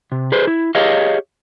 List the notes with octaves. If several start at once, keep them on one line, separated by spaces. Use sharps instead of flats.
C3
G#4 B4 C5
E4
G4 G#4 C#5 D#5 F5